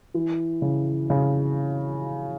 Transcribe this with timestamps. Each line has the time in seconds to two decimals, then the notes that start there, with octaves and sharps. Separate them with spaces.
0.14 E3
0.62 C#3
1.10 C#3